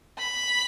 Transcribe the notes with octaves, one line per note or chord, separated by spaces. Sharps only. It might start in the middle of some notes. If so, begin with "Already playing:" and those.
B5